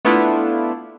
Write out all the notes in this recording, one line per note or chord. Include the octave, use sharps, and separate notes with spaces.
A3 B3 D4 E4 F4